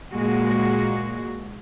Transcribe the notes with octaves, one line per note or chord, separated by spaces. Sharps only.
A#2 G#3 A#3 F#4